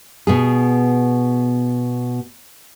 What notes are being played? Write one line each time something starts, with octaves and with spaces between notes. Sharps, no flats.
B2 B3 G#4